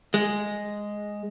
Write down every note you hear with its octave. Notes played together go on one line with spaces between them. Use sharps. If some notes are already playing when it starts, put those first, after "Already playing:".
G#3